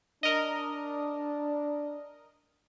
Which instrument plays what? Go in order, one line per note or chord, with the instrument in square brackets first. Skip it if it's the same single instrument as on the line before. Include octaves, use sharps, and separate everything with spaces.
[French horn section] D4 [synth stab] A#4 D#5